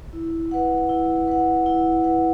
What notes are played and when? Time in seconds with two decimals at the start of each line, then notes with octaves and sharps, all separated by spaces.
0.13 E4
0.51 B4 F#5
0.89 E4
1.28 B4 F#5
1.66 E4
2.04 B4 F#5